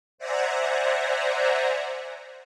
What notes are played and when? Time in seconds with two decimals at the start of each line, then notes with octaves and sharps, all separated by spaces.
0.18 C5 D5 E5 F#5 G#5 A#5